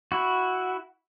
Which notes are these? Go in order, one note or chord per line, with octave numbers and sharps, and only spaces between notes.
E4 F#4